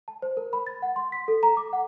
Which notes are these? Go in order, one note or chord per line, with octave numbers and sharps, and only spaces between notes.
A5
C5
A#4
B5
A6
F#5
C6
B6
A4
A#5
D6
F#5